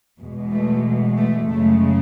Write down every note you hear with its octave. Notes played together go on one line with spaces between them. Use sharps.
E2 B2 G#3
A3
A3
F#2 C#3 G#3 A3